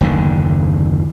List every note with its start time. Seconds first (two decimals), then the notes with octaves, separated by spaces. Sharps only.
0.01 F#1 D#2 D3